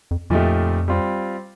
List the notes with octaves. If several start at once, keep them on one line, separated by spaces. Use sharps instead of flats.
F2
F2 A#2 F3 A3 D#4 G4
G3 C4 F4